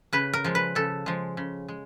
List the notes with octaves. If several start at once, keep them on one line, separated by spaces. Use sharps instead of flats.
C#3 B4
A#4
F3 G#3
B4
C#3 A4
F3 G#3
C#3
G#3